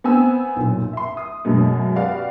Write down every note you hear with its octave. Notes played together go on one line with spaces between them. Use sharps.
B3 C4 G#5 E6
B1 F#2 A#2
E5 C6
D#6
F#2 B2 G#3 A3 B3
F#4 G4 B4 D5 F5